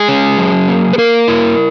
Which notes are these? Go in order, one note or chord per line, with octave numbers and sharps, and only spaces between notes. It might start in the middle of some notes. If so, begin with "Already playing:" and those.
Already playing: G#3 G#4
C#4
F#3
A#3
B4
A#3 A#4
E4